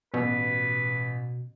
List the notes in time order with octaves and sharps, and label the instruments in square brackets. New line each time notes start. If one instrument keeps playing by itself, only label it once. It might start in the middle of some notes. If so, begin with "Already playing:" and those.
[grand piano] A1 [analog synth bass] B2 [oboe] B4